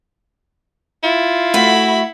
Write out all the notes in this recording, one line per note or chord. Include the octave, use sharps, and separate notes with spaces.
E4 F4
A3 F#4 B5